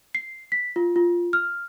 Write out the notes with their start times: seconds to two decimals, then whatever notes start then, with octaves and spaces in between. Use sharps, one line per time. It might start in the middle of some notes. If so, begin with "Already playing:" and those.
0.15 C7
0.52 B6
0.76 F4
0.96 F4
1.33 F6